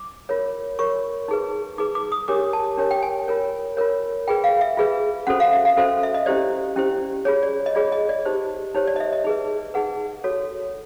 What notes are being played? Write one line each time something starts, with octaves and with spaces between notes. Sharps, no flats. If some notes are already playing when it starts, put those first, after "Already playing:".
Already playing: D6
F4 A#4 C#5
F4 A#4 C#5 C#6
D#4 G#4 B4
D#4 G#4 B4 D6
D6
D#6
D4 G4 A#4 C#5 D6
A5
D4 G4 A#4 C#5
G5
G#5
F4 A#4 C#5
F4 A#4 C#5
F4 G#4 B4 G5
F5
E5
F4 G#4 B4
C#4 F#4 A4 C5 F#5
F5
E5
F5
C#4 F#4 A4 C5
E5
D#5
C#4 E4 G4 C5 D5
C#4 E4 G4 C5
F4 G#4 C#5
D5
D#5
F4 G#4 C#5 D5
D#5
D5
D#4 G4 C5
D#4 G4 C5 C#5
D5
D#5
E5
D#5
D#4 G#4 B4
D#4 G#4 B4 F#5
F#4 A4 C#5